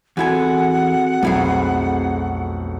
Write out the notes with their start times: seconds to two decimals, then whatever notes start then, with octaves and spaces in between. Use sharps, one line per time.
0.17 E2 C4 E4 F#4 G#4 A4 F#5 G#5
1.23 B1 F2 A3 E4 G#4